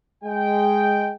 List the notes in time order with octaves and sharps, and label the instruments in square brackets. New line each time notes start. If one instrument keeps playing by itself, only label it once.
[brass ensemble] G#3 G5